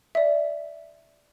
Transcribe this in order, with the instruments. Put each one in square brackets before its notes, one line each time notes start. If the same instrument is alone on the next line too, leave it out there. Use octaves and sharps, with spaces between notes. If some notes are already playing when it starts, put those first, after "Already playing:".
[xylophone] D5 E5